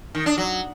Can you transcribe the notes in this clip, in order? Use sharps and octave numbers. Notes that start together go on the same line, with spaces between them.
D#3
D4
F#3